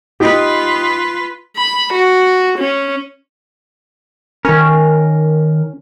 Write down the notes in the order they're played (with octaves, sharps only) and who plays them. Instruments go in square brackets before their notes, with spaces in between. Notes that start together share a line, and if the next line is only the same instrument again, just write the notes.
[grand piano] D#4 G4 [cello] F4 B4
[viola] B5
F#4
C#4
[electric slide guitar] D#3 A#4 [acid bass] C#4